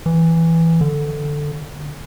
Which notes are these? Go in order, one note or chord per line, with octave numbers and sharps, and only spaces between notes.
E3
D3